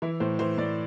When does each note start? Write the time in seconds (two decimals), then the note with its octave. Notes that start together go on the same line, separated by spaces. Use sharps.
0.02 E3 E4
0.20 A2 C5
0.39 E3 C5
0.58 A2 D5